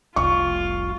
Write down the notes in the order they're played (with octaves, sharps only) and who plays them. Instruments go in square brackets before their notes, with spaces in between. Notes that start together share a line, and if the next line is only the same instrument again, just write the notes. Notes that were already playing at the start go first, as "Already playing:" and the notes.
[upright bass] F1 C2 [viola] F4 [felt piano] C#6